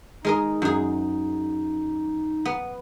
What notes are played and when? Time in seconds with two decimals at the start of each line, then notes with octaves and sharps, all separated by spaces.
0.25 G#3 D#4 A#4 D#5
0.62 F#2 G#4
2.45 B3